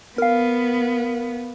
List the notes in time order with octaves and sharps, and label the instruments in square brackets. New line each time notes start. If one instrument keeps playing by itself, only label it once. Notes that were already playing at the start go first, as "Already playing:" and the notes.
[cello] B3 [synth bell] A#4 F5